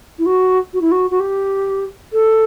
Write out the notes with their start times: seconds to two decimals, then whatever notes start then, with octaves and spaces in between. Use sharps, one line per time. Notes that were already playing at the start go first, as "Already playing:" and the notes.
0.19 E4
0.26 F#4
0.73 F#4
0.81 E4
0.92 F#4
1.10 F#4
1.20 G4
2.13 A4